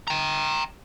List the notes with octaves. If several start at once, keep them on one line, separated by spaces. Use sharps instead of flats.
G5 A#5